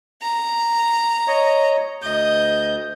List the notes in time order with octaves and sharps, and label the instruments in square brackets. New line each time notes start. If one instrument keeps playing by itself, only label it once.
[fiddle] A#5
[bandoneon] C#5 D#5
[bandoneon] D2 G6 [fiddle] D#5